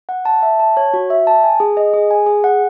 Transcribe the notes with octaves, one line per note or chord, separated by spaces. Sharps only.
F#5
A5
E5
A5
C#5
F#4
E5
A5
G#5
G#4
D#5
G#4
G#5
G#4
F#5